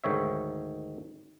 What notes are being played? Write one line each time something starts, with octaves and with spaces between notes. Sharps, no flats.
D2 G#2 D#3 C#5 E5